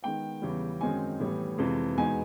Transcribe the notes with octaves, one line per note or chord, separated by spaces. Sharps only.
D#3 G#3 B3 G5
E2 C#3 E3 G3
F#2 D#3 G#3 C4 D#4 G#5
A2 E3 G3 B3
F2 C3 E3 G#3
E2 B2 G#3 B3 D#4 G#5